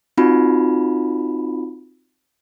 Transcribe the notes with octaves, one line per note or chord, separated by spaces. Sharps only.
C4 D#4 F4 F#4 B5